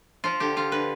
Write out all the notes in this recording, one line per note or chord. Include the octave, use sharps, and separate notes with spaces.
F3 F4
D3 G4
D3 F4
D3 B4